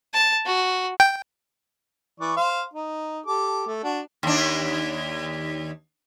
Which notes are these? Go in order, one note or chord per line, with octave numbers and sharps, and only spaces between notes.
A5
F#4
G5
E3 D5 C#6
C5 F5
D#4
G4 A4 D6
A3
D4 F#4
D#2 D4